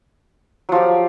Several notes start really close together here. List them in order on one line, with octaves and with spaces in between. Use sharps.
F#3 F3 G4